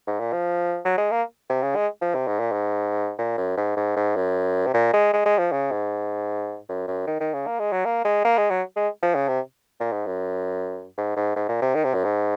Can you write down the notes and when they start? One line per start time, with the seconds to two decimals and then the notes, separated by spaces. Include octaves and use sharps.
0.07 G#2
0.20 A#2
0.32 F3
0.85 F#3
0.97 G#3
1.11 A#3
1.50 C3
1.63 C#3
1.75 G#3
2.01 F3
2.15 C3
2.27 G#2
2.39 A#2
2.52 G#2
3.18 A#2
3.38 F#2
3.57 G#2
3.77 G#2
3.96 G#2
4.16 F#2
4.66 C3
4.74 A#2
4.93 G#3
5.13 G#3
5.26 G#3
5.39 F3
5.52 C#3
5.71 G#2
6.69 F#2
6.88 F#2
7.07 D#3
7.20 D#3
7.33 C#3
7.47 A#3
7.59 G#3
7.72 F#3
7.85 A#3
8.04 G#3
8.25 A#3
8.37 G#3
8.50 F#3
8.76 G#3
9.02 F3
9.15 C#3
9.28 C3
9.80 A#2
9.92 G#2
10.06 F#2
10.97 G#2
11.16 G#2
11.36 G#2
11.49 A#2
11.62 C3
11.75 D#3
11.84 C3
11.94 F#2
12.04 G#2